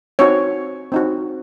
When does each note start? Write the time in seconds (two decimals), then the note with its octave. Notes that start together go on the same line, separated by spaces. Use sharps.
0.19 C4 D#4 F#4 C#5
0.92 C4 D#4 F#4